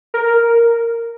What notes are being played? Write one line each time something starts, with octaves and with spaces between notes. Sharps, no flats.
A#4